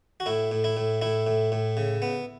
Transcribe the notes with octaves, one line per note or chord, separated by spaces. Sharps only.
F#4
A2 E4
A2
E4
A2
A2 E4
A2
A2
C#3
B3